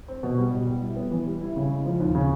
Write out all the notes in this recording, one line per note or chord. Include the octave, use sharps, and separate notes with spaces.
C4
B2
G3
B2
G3
E4
B3
E3
G3
E4
C#3
G#3
F3
D#2
C#3